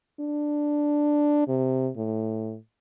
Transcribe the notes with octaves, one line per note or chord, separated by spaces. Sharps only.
D4
C3
A2